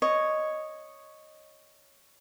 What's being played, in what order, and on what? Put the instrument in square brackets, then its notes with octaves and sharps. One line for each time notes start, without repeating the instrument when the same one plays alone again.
[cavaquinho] C#5 D#5